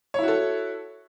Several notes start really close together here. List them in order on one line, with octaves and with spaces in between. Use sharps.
C#5 E4 F#4 A4